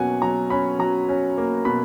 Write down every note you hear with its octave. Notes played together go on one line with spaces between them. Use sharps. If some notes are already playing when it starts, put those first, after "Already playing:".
Already playing: B2 F#3 A#3 C#4 F#5 G#5
F#3 A#5
C#4 B5
F#3 A#5
C#4
A#3
B2 B5